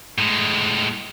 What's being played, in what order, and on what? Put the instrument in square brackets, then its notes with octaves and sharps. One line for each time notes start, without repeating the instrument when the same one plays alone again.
[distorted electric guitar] A2 G#3